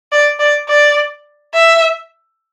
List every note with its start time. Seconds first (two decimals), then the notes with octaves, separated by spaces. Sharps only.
0.12 D5
0.39 D5
0.69 D5
1.54 E5